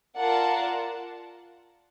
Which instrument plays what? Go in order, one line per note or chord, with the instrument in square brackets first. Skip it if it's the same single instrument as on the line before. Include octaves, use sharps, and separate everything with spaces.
[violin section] F4 A#4 D5 F#5 A5